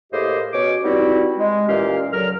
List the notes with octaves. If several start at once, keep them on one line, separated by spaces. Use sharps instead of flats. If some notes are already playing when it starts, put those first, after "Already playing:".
A2 A#3 G4 G#4 C5 D#5
B2 C#4 C#5 D6
G3 B3 C4 D#4 E4 F#4
G#3
A#2 E3 C#4 G4 F5
C#2 D3 F#3 A#4 F6